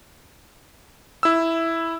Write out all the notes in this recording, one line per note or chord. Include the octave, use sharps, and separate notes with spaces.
E4 E6